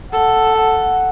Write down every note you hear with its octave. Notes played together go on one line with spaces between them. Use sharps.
A4 F#5
F#5